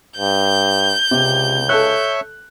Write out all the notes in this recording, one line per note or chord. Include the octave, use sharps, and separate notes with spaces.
G2 G6
C#2 C3
A4 C#5 E5 F#6